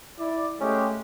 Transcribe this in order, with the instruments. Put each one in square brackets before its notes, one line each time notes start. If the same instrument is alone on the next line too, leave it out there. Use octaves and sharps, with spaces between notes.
[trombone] E4 [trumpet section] D5
[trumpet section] G#3 G4 [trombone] A3 [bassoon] C#4